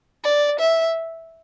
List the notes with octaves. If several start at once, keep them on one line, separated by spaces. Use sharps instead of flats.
D5
E5